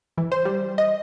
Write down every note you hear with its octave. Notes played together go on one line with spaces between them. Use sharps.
E3
C5
G3
D#5